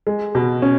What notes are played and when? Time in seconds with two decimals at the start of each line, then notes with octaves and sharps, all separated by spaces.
0.07 G#3
0.35 B2
0.62 C#4